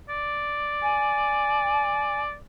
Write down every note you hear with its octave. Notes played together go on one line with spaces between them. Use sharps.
D5
G#5